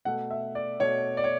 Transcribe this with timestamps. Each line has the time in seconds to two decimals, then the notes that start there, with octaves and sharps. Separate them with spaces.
0.05 B2 A3 F#5
0.31 E5
0.55 D5
0.80 B2 A3 C#5
1.17 D5
1.24 C#5